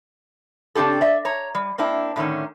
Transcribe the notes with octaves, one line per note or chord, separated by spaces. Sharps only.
C#3 C4 D4 G4 A4
D5 E5
C#5 A#5
G3
A#3 C4 D4 E4
A2 D3 D#3 C#4